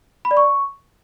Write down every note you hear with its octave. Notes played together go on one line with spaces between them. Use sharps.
B5
D5
C#6